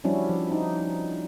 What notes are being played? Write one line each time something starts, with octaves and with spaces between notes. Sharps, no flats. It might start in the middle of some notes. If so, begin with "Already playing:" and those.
F3 G3 C#4 D4 E4 F#4
F3
D#4